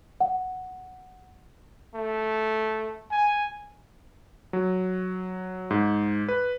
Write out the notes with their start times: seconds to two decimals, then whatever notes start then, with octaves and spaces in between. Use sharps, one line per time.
0.20 F#5
1.95 A3
3.11 G#5
4.53 F#3
5.71 G#2
6.29 B4